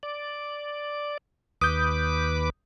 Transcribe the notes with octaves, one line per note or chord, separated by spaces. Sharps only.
D5
D#2 B4 D6 D#6 G6